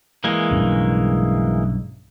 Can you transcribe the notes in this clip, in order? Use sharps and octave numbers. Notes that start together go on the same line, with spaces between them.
E3 G#3 A#3
B1 G2 C#3